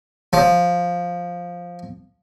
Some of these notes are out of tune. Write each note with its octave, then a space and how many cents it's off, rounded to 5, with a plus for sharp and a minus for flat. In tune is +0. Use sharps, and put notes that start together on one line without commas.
F3 +5